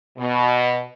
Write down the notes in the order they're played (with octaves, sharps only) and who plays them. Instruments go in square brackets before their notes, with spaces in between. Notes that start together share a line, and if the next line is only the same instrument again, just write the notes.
[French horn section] B2